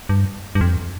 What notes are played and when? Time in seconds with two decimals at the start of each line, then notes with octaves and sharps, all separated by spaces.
0.09 G2
0.55 G2
0.61 F2